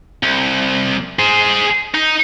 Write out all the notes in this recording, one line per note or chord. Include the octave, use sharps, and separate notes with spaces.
C2
G#4 C5
D#4